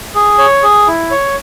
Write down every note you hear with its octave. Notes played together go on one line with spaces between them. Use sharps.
G#4
C#5
G#4
E4
C#5